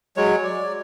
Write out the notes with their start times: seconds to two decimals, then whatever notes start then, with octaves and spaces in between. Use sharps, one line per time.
0.17 F#3 G#3 C#5
0.44 D5